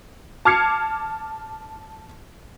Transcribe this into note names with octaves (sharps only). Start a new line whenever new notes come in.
A5 D6 F6 G#6 C7 C#7